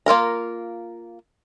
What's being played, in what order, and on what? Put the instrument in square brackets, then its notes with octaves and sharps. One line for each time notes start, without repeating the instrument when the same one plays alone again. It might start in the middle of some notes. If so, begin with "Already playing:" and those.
[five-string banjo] A#3 F4 A#4 A#5